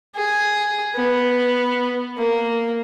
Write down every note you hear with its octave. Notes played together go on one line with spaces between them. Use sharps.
G#4
B3
A#3